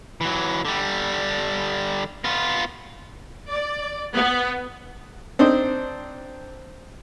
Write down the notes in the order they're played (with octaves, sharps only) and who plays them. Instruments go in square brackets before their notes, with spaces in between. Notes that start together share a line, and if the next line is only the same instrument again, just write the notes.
[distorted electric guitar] E3 F#3
D3 G3
B3 F4
[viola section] D5
B3
[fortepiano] C4 D4 D#4 C5